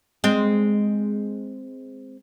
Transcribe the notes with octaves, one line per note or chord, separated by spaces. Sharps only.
G#3 C4